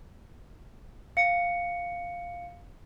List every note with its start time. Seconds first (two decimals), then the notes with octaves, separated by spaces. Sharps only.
1.17 F5 C#7